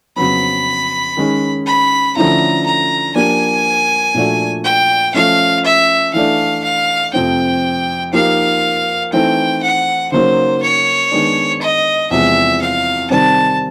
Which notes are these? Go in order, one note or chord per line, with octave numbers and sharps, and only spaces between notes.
F2 C#3 F#3 B3 B5
D#3 G#3 C#4
B5
D3 F3 A3 C#4 E4 A#5
A#5
F3 A#3 D4 G4 G#5
A#2 F3 A3 D4 F#4
G5
F3 A3 C#4 F5
E5
E3 A3 D4 F5
F5
F2 C3 F3 A3 C4 G5
F3 A#3 D#4 G4 A#4 F5
E3 A3 C4 D#4 G5
F#5
C#3 F#3 A#3 D#4 C5
C#5
D#3 G#3 B3 D4
D#5
E2 C3 F3 G#3 E5
F5
C3 D#3 G3 C4 A5